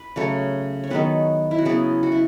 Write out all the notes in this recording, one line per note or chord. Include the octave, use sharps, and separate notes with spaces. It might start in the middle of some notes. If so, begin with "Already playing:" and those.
Already playing: B4
C#3 F#3 A3 A4 C#5
C#5
D#3 F#3 B3 G#4 B4
E4
F#4
C#3 F#3 B3 E4 G#4
F#4
E4